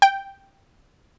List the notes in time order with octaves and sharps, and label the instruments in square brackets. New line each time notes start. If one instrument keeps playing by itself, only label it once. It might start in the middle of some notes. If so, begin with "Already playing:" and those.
[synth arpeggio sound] G5